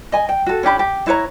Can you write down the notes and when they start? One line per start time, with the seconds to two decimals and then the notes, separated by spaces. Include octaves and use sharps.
0.12 D#5 G#5
0.29 G5
0.46 F#4 A4
0.63 C#4 D4 G4 B5
0.79 G4
1.07 E4 B4 C#5 A#5